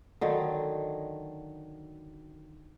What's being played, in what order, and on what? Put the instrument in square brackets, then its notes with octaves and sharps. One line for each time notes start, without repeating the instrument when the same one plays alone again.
[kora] D3 D#3 F#3